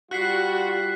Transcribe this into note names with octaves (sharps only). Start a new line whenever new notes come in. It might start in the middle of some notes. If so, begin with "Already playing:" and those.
G3 F4 F#4 F#6 B6 C7